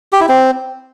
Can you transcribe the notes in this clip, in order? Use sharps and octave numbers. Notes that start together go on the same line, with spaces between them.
G4
E4
C4